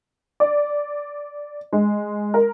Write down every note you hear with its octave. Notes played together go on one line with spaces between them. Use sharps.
D5
G#3
A#4